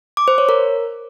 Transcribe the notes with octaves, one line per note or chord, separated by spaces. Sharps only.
D6
C5
C#5
A#4